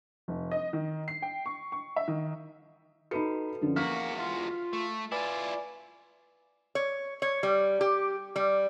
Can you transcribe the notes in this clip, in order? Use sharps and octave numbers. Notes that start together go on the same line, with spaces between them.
F1
D#5
D#3
C7
G5
C#6
C#6
E5
D#3
D#4 F#4 A4 B4 B5 C#7
F#2 D3 F3
E2 A#3 F#4 F6 B6
F4
A3
E4 F4 B4 D5 G#5 B5
C#5
C#5
G3
G4
G3